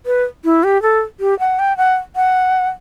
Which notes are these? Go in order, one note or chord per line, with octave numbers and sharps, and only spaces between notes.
B4
E4
G4
A4
G4
F#5
G5
F#5
F#5